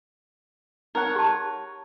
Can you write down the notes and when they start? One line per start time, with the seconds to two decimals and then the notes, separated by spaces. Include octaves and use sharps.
0.95 D#4 A#4 C#5 F#5
1.16 G4 A5